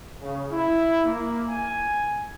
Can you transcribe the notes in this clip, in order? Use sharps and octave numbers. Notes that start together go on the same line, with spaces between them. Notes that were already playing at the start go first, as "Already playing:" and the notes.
C#3
E4
A#3
G#5